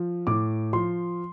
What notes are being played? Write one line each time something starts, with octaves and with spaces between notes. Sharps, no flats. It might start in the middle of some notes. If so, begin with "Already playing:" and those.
Already playing: F3
A2 D6
F3 C6